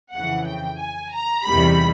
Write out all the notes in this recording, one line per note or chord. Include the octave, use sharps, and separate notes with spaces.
F2 C#3 E3 F#5
G5
G#5
A#5
E2 C3 D#3 G3 B5